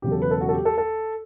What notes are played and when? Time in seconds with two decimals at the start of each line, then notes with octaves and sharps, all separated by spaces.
0.02 E1 E2 C#3 F#3 G4
0.11 A4
0.22 B4
0.31 A4
0.41 F#4
0.49 A4
0.53 G4
0.65 A4
0.78 A4